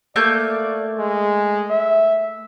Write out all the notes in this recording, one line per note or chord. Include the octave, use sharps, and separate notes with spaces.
A3 A#3 D5 G6
G#3
E5